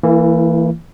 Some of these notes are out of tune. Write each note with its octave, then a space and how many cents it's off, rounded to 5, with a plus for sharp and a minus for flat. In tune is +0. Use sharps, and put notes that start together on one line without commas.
E3 +0 A#3 -35 E4 +35